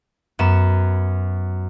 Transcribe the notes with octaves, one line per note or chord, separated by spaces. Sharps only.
F#2 B3 E7